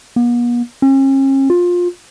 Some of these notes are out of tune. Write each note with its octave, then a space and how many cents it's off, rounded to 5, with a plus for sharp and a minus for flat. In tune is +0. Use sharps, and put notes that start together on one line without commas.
B3 -45
C#4 -40
F4 +20